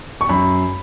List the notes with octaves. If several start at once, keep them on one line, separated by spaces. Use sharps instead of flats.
C#6
F#2 B5